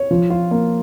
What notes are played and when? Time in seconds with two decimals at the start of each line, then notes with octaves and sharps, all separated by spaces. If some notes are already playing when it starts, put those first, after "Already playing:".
Already playing: C#5
0.11 F3
0.30 F4
0.51 A#3